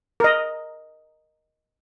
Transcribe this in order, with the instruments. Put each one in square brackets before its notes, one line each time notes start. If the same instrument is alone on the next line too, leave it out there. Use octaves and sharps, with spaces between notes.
[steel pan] A#4 D#5